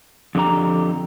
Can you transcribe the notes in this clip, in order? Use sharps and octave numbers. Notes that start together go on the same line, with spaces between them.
F2 D3 G4 A#5